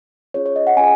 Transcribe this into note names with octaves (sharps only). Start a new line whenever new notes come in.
C#4 F4 G#4 C#5
C#5
D#5
F#5
C#4 F4 G#4 G#5